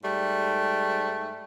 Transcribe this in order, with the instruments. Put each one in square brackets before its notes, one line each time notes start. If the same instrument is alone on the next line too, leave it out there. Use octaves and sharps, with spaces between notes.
[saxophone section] G#2 G3 A3